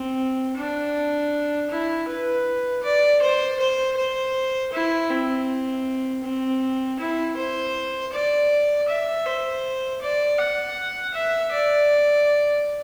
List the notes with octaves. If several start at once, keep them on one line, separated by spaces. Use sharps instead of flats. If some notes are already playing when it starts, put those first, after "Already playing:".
Already playing: C4
D4
E4
B4
D5
C5
C5
C5
E4
C4
C4
E4
C5
D5
E5
C5
D5
F#5
E5
D5